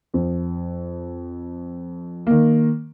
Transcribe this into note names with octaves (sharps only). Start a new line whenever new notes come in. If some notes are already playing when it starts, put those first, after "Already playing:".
F2
D#3 A#3